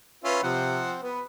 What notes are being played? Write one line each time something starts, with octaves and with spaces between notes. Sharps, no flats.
C#4 F4 B4 E5
C3 F3 C4 F#5
B3 B4